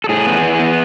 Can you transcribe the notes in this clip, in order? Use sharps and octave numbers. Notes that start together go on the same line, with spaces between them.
A4
A2 G#4
B3
E3
B3